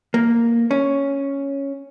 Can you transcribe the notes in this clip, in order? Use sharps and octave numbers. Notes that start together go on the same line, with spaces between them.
A#3
C#4